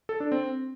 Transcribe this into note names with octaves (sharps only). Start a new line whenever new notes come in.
A4
D4
C4